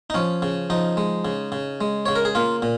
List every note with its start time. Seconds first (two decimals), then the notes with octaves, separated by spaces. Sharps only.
0.10 D#4
0.14 F3 C#4
0.42 C#3
0.70 F3 D#4
0.97 G#3
1.25 C#3
1.52 C#3
1.81 G#3
2.06 C#3 C#5
2.16 A#4
2.25 G#4
2.35 A#3 F4
2.62 A#2